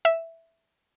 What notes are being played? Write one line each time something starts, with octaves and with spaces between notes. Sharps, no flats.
E5